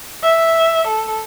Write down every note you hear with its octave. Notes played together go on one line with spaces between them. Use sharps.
E5
A4